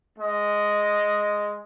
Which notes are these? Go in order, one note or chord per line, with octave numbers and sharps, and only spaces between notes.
G#3 D#5